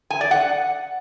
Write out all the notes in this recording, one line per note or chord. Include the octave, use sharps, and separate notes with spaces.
G#5
D5
F#5